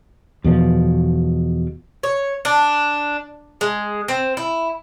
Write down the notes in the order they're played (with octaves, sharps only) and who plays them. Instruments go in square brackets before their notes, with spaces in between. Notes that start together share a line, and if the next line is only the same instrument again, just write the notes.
[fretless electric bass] E2 B2 F3
[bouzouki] C#5
D4
G#3
C4
E4